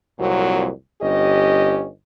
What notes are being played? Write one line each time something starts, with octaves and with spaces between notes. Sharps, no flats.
C2 F2 A#2 F#3
G1 C#4 G4 D#5